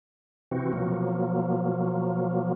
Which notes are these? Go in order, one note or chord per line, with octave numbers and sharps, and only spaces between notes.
C3 E3 C4 F#4
B2 F3 F#3 A#3